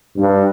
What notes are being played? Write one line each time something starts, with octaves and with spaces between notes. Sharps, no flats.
G2